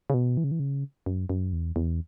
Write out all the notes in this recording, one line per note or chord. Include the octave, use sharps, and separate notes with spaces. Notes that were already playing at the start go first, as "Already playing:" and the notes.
C#3
B2
E3
C#3
E3
C#3
F#2
F#2
E2
E2